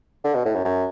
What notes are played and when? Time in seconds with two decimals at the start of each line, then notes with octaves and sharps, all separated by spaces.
0.24 D3
0.35 B2
0.45 A2
0.55 F#2
0.65 F#2